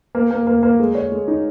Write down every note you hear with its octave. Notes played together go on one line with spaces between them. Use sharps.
A#3
A#3
A#3
A#3
G#3
C#5
G#3
D#4